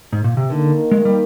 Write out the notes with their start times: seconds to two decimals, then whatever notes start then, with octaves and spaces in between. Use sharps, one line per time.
0.13 G#2
0.24 A#2
0.37 C3
0.50 D3 D#3 A#3 D#4 A#4
0.91 G#3
1.05 G3